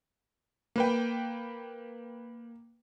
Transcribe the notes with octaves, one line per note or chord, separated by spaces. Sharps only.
A#3 B4 G5